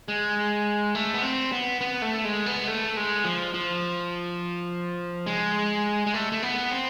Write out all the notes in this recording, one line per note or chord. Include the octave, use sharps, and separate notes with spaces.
G#3
A3
B3
C4
B3
B3
A3
G#3
B3
A3
G#3
F3
F3
G#3
G#3
A3
A3
B3
C4